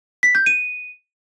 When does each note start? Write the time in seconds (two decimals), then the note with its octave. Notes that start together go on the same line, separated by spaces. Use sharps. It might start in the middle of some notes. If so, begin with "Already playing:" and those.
0.23 B6
0.35 G6
0.46 D#7